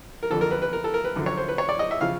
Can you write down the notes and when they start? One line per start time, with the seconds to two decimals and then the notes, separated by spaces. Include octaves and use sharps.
0.23 A#4
0.30 F2 D3 F3 A4
0.41 A#4
0.51 B4
0.62 B4
0.73 A#4
0.84 A4
0.94 A#4
1.05 B4
1.16 F#2 D3 F3
1.26 C#5
1.37 C5
1.48 B4
1.58 C#5
1.69 D5
1.79 D#5
1.91 E5
2.01 C#3 F3 F5